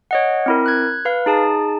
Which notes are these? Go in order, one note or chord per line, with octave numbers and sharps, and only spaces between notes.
C#5 D#5 F#5
C4 E4 A#4
F#6 G#6
B4 F5
D#4 G#4 A5